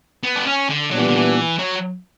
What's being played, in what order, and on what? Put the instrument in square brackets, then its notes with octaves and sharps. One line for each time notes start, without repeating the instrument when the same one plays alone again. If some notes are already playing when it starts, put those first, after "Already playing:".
[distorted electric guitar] B3
D4
C#4
D3
[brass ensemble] A#2 G3 B3 D4 [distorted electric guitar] F#3
[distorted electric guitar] E3
D3
E3
F#3